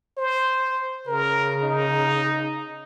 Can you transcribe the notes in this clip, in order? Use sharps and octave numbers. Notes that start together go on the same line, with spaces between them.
C5
C#3 A#4
D#4